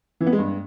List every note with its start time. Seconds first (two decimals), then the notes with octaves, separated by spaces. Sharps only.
0.21 E3
0.27 B3
0.33 G#3
0.38 G2